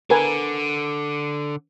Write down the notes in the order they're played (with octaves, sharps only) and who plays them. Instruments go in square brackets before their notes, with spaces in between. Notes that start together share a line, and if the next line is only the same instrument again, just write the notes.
[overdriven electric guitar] D3 [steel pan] A#4 B4 G#5